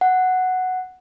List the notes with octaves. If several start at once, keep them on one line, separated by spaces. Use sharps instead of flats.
F#5